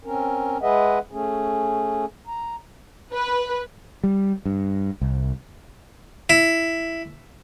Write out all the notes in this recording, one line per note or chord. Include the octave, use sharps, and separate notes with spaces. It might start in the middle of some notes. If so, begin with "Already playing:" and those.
C4 C#4 A#4
G#3 G#4 B4 D#5 E5 F#5
A3 C#4 G#4
A#5
B4
G3
G2
C2
E4